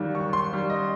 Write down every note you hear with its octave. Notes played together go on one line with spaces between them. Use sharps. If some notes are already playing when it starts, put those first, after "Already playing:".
Already playing: D#2 D#3 G3
D#2 C#6
C6
D#3 G3
D#5